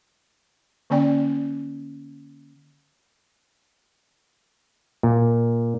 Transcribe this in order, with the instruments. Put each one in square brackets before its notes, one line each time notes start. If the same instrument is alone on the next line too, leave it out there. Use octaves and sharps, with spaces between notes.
[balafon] D3 A#3 C#4 D5 G5
[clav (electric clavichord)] A#2